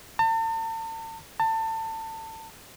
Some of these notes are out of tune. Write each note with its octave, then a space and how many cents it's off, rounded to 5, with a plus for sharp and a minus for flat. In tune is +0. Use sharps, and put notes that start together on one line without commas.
A5 +40
A5 +25